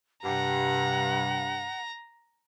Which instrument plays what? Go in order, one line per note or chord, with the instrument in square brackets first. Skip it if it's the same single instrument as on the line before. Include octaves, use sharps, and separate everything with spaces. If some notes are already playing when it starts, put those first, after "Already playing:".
[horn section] G2 [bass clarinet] C3 [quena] F#5 [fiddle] A#5